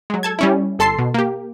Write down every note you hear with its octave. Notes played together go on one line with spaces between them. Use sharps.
F#3 G#3
A4 A5 G#6
G3 C#4 E4
G1 A4 A5 C6 C7
B2
A#3 G4